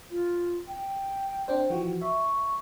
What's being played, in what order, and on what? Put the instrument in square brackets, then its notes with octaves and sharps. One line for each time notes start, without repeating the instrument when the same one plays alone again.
[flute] F4
G5
[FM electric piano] C4 D4 C5
E3 F3 F#4
[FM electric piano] E5 [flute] C#6